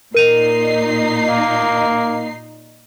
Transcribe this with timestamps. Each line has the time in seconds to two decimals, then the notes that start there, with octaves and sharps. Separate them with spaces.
0.15 A#2 D#4 A#4 C7 D#7 F7
1.27 A#3